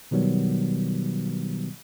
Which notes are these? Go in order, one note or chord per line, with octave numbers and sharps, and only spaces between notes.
B2 D#3 F#3 G3 B3